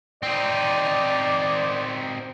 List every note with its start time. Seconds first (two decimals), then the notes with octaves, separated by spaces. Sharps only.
0.23 C4 D#4 D5